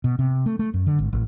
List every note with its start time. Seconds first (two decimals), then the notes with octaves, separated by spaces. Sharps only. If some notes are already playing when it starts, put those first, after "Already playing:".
0.04 B2
0.19 C3
0.46 A3
0.59 A3
0.74 F#2
0.87 D3
0.99 G#1
1.13 A1